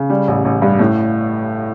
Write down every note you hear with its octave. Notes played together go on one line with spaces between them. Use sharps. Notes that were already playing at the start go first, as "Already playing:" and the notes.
Already playing: C#3
G3
A1
A1
G2
A2